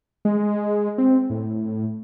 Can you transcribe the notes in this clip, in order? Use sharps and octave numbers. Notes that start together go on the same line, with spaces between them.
G#3
C4
A2